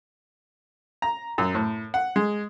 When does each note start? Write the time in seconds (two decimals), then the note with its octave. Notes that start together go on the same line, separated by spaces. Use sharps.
1.02 A#5
1.38 F#2
1.55 A2
1.94 F#5
2.16 G#3